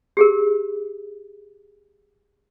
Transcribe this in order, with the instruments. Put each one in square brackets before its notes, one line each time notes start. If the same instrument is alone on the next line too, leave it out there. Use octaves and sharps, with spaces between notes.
[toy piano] G4 G#4 A#4